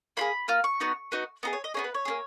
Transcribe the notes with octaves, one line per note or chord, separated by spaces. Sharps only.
A#3 F4 G#4 B5
A#3 F4 F6
C#6
B3 D#4 F#4
B3 D#4 F#4
B3 D#4 G#4 D#5
C#5
D#5
B3 D#4 G#4 C#5
B4
C#5
A#3 C#4 G#4